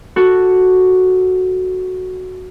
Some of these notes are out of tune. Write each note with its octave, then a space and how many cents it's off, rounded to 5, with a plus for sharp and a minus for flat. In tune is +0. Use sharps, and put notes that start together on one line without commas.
F#4 +0 A4 +5